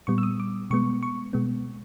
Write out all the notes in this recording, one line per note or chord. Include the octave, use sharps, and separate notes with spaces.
A#2 G3 B3 C#6
E6
D#6
D6
B2 G#3 B3 C#6
C#6
B2 G#3 B3